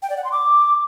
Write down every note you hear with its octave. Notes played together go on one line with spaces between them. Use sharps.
G5
D5
F#5
C6
D6